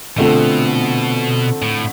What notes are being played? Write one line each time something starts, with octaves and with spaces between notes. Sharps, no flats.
B2 D3 A3 C4 F4 A4
A2